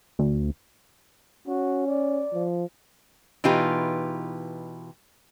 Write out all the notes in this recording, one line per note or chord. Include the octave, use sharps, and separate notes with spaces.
D2
C#4 F#4
D5
F3
B2 E3 D#4 F4 G4 B4